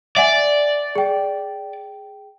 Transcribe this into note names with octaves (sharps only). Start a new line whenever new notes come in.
D5 E5 F#5 G#5
G#4 G5